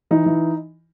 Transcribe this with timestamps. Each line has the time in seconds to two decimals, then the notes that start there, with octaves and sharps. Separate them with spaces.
0.11 E3 D#4
0.26 E3